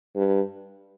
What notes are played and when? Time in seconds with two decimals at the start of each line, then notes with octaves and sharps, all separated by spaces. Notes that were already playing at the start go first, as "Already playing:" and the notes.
0.16 G2